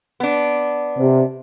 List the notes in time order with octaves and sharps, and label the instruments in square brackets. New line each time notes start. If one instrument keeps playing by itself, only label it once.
[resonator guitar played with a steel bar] B3 D4
[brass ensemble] C3